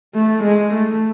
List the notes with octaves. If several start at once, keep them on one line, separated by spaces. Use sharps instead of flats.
A3
G#3
A3